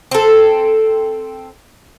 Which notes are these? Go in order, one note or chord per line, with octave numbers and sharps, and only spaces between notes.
C4 A4